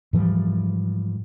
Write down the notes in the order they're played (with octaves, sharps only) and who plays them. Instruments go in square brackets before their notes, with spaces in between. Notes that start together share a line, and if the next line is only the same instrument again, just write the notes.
[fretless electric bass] G#2 E3 F3 G3